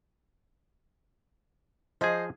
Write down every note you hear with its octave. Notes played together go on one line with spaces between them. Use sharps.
F3 G#4 C5 D#5